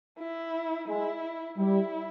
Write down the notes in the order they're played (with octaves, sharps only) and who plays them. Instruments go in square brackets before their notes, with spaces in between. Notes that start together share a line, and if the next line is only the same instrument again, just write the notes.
[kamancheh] E4
[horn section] G#3 [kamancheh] E4
[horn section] G3 [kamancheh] E4